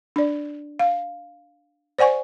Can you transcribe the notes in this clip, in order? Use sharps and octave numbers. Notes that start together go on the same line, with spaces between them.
D4 D5
F5
C5 D5 F#5 G#5 C#6